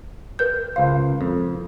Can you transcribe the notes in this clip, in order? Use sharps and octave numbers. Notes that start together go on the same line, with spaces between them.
A#4 B4 G6
C#2 C5 F5
F2